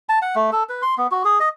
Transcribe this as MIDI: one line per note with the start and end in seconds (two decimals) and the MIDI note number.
0.09 0.19 81
0.22 0.35 78
0.36 0.50 57
0.53 0.63 69
0.69 0.82 71
0.82 0.95 84
0.98 1.07 59
1.11 1.23 66
1.25 1.39 68
1.40 1.49 75